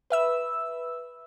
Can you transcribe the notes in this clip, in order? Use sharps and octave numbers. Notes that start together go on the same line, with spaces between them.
B4 E5 E6